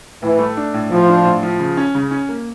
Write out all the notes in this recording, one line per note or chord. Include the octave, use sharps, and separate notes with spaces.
A2 E3
A3
D4
A2
A2 F3
D4
A2
F3
C#3
C#4
C#3
C#4
A#3